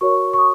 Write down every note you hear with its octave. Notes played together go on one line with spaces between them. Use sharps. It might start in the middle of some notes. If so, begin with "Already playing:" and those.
F#4 A#4 C#5 C#6
C#6
D#6